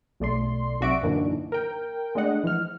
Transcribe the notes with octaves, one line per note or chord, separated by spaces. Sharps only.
B1 A3 D5 C6
B1 C3 F#4 D5 E5 D7
F#2 A#2 D3 E3 D4 D#4
A#4 G5
G#3 A3 D4 D5 D#5 F#5
E3 F3 F6